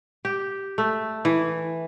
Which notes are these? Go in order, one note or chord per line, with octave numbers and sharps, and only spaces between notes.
G4
A3
E3